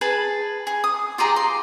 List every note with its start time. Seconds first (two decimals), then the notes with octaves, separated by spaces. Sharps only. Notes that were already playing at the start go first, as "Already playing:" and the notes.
0.01 G#4 B4 A5 B5
0.67 G#4
0.84 D#6
1.18 F4 G4 G#4 A#5
1.36 C6